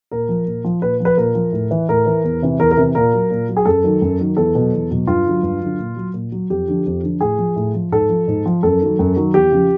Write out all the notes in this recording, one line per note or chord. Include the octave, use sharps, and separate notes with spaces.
A#2 A#4
F3
A#2
F3
A#2 B4
F3
B4
A#2 A#4
F3
A2
E3
A2 A#4
E3
E2
C3 E3
E2 A#4
A#4
C3 E3
A#2 A#4
F#3
A#2
F#3
G#4
F#2 A4
D#3 F#3
F#2
D#3 F#3
E2 A4
B2 F#3
E2
B2 F#3
G2 F4
D3 F#3
G2
D3 F#3
A#2
F#3
A#2
F#3
F2 G4
D3 F3
F2
D3 F3
A2 G#4
F3
A2
F3
G#2 A4
F3
G#2
F3
F#2 A4
D#3 F#3
F#2
D#3 F#3
E2 G4
C#3 F3